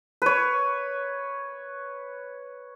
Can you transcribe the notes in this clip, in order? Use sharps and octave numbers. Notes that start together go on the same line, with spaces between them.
B4 C#5